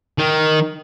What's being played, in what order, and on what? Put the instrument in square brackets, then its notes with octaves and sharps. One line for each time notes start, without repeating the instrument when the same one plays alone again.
[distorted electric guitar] D#3